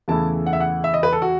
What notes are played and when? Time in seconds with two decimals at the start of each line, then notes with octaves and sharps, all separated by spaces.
0.08 E2 C#3 E3 A3 E4 A5
0.46 F#5
0.53 E5
0.60 F#5
0.84 E5
0.94 D#5
1.03 B4
1.13 A4
1.22 F#4